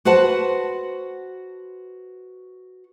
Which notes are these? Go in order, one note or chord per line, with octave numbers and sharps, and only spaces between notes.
F#4 B4 C5 F#5 A5